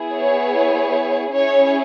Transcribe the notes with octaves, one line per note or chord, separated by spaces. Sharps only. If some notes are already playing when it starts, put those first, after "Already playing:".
Already playing: B3 E4 G#4
C#5
C#4 E4 G#4 C#5